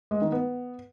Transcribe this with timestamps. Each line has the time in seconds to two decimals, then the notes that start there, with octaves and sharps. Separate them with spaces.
0.11 G#3
0.22 D#3
0.32 B3